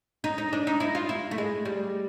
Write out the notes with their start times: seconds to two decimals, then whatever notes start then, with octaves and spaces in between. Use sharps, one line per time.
0.24 D#4
0.38 D#4
0.53 D4
0.67 D#4
0.80 E4
0.95 F4
1.09 E4
1.31 A3
1.38 G#3
1.65 G3